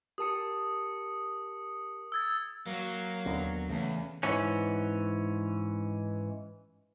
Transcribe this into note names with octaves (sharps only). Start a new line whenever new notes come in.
G4 A#4 A5 D#6 C#7
E6 G#6 A6
F#3 A#3
D#2 D3 B3
E2 C#3 A3 C#4
G#2 E3 C#4